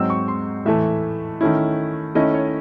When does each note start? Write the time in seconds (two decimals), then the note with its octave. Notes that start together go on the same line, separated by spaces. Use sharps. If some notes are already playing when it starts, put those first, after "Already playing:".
Already playing: G#2 F#3 C4 D#4 E6
0.10 C#6
0.28 C6
0.65 A2 E3 A3 E5
1.41 D#3 A3 C#4 E4
2.15 D#3 A3 C#4 E4 D#5
2.34 C#5